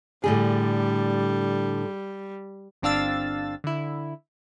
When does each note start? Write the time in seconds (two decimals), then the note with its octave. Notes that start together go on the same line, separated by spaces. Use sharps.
0.24 A2 D3 G3 G#4
2.82 G1 C4 D4 F5 E6 A6
3.64 D3 E4